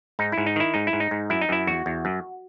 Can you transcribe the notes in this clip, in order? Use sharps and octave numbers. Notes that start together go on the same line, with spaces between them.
G#2 D#4
E4
G#2
D#4
D#3 E4
G#2 D#4
E4
G#2
D#4
G#2
F#2 E4
D#4
F#2 E4
E2 F#4
E2
F#2